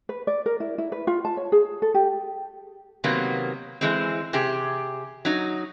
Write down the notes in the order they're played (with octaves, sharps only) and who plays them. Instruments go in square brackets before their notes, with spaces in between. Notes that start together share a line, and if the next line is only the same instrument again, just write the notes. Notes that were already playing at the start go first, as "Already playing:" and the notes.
[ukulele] B4
D5
A#4
E4
E4
B4
F4
A5
C#5
G#4
A4
G4
[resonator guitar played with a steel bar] C3 D#3 F#3 A#3 B3
E3 G#3 C4
C3 G4 G#4
F#3 D#4